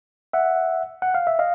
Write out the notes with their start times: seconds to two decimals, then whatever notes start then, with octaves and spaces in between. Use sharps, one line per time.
0.33 E5 F#5
1.02 F#5
1.14 F5
1.27 E5
1.39 D#5 F5